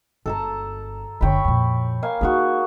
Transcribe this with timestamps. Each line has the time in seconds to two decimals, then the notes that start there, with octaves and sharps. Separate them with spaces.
0.26 G1 A4 A5 A#5
1.21 F#1 D3 C#5 G5 B5
1.45 F2 A#2
2.03 A#3 F5 G#5
2.21 A#3 D#4 F#4 G#4